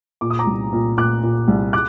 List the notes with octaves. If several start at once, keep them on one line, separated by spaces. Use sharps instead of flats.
A#2 D6
D#6
A#5 D6
C2
A#2
A#2 D6 F#6
A#2
C2
D6 F#6